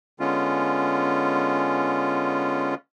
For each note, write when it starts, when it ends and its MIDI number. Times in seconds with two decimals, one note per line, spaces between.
0.20 2.75 50
0.20 2.75 56
0.20 2.75 59
0.20 2.75 61
0.20 2.75 65